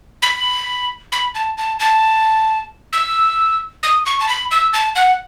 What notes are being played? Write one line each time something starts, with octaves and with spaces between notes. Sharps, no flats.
B5
B5
A5
A5
A5
E6
D#6
C#6
A5
B5
E6
A5
F#5